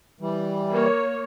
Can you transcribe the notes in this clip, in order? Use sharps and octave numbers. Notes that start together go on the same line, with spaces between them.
E3 G3
A#3 C#5